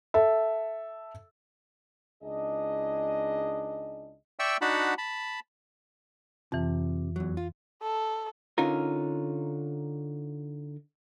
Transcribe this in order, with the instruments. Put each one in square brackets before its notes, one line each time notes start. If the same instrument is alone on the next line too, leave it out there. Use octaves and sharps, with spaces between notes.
[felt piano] A4 E5
[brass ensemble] C#2 D4 D#4 G#4 D#5
[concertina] D5 E5 G5 C#6 E6
D4 D#4 F#4 F#5 A5 B5
A5 B5
[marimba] F2 E3 [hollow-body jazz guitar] C3
[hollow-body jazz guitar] E2 F#3
F4
[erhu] A4
[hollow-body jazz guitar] D3 C#4 D#4 F4 A#4